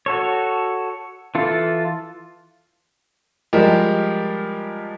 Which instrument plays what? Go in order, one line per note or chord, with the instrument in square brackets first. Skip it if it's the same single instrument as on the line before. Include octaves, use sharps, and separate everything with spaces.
[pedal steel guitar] F#4 A4 C#5
E3 F4 A4
[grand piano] F3 G3 G#3 G4 A#4